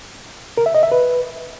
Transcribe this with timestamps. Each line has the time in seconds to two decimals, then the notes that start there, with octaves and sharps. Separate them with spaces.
0.57 A#4
0.66 E5
0.75 D#5
0.83 E5
0.92 B4